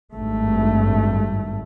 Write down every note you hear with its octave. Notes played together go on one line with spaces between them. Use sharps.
G#1 G2 A3